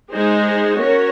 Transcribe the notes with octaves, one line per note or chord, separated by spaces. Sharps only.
G#3 D#4 G#4 C5
C#4 F#4 A#4 C#5